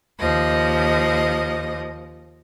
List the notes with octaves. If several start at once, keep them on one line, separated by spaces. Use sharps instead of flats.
D#2 F3 D#5